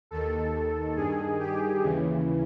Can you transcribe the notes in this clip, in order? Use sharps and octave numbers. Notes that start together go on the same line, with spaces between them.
D#2 D#3 A4
G2 D#3 G#4
G4
D#2 C#3 E3